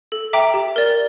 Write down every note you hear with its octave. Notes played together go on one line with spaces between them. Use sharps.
A4
E5 G5 A#5 D6
G4
A#4 D5